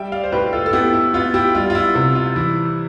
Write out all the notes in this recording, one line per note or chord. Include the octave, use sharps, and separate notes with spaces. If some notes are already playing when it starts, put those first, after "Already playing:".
Already playing: G3 E5 G5
D5 F5
C5
A2 G4 B4
F4 A4
A4
B3 E4 G4
E4
B3 F4
E4 G4
G3 F4
F4
E4
C3 E4
F4
E3 E4